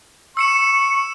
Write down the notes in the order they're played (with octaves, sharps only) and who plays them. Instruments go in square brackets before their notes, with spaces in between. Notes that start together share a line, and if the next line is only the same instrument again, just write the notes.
[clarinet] C#6 [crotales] E6 C#7 E7